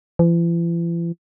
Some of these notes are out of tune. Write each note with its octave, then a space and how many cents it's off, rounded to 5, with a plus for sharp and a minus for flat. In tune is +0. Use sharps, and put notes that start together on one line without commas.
E3 +45